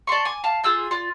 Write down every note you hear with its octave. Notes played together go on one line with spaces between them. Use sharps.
D5 A5 C6 C#6
G#5 D6
F5 A5
F4 G#4 E6 G6
F4 D5